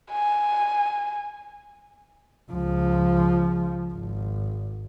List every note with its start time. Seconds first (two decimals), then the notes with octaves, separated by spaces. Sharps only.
0.12 G#5
2.51 C#2 F3
3.93 G#1